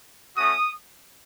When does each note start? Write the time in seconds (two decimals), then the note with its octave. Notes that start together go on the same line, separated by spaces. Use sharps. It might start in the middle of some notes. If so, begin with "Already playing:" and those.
0.36 A3 C#4 F#4 D#6